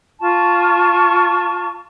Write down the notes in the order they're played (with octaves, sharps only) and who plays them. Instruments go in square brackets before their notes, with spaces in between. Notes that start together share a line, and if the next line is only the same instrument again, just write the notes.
[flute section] F4 A5 C#6